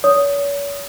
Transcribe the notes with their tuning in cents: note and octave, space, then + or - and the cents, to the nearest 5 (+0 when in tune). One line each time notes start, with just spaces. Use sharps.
C#5 +40 D#6 +0